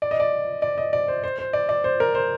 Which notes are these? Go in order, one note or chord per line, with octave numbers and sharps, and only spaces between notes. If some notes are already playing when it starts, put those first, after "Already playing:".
D5
D#5
D5
D5
D#5
D5
C5
C5
C5
D5
D5
C5
A#4
C5